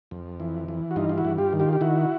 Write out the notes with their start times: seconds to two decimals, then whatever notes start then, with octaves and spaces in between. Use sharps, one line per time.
0.11 F2
0.40 E3
0.68 E3
0.91 F#4
0.96 G2 D#4 F4
1.09 F4
1.18 E4 F#4
1.25 G2
1.38 F4 G4
1.53 D#3
1.60 F4 G4
1.73 G4
1.81 D#3 E4 F#4